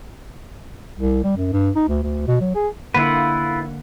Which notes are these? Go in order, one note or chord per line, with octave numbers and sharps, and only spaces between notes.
C2
G3
F#2
G2
D#4
D2
D2
B2
F#3
G#4
D3 A#3 E4 F4 B4 F#5